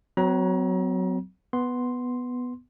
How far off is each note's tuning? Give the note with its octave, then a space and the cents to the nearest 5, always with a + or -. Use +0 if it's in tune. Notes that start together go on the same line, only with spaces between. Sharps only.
F#3 +0 C4 -45 A#5 +35
B3 +0 C6 +0